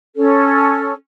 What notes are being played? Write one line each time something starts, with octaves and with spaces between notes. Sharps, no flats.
C#4 A4